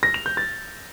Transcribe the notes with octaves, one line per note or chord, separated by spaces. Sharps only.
A#6
F7
G6
A6